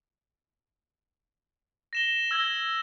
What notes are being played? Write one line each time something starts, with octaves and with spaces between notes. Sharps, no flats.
A#6 E7 G7
E6 G#6 A#6 G7